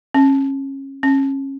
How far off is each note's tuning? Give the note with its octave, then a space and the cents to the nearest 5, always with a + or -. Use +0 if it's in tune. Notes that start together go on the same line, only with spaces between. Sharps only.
C#4 -25
C#4 -25